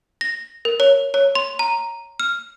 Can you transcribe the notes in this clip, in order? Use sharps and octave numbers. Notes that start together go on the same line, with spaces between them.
A#6
A#4
C#5
C#5
C6
A#5
F6